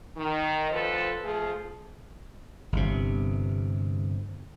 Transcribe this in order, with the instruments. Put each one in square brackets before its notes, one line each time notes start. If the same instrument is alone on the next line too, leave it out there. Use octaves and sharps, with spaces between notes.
[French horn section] D#3
D2 F3 A4 B4 C5
F3 A3 G#4
[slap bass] G1 C3